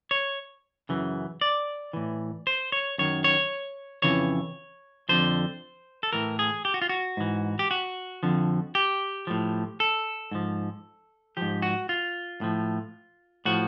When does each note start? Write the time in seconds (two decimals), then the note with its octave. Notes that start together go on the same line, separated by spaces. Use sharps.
0.11 C#5
0.89 F#2 C#3 E3
1.41 D5
1.93 A2 E3
2.47 C5
2.72 C#5
2.98 F#2 D#3 C#5
3.24 C#5
4.02 F2 C#3 E3 C#5
5.09 F2 D3 F3 C5
6.03 A4
6.13 A2 E3 A#4
6.39 G#4
6.65 G4
6.74 F#4
6.82 F4
6.89 F#4
7.17 G#2 E3
7.59 G4
7.71 F#4
8.23 F2 D3 F3
8.75 G4
9.27 A2 F3
9.80 A4
10.31 G#2 F3
11.37 G#2 F3 G4
11.62 F#4
11.89 F4
12.41 A2 F3
13.45 A2 F3 F#4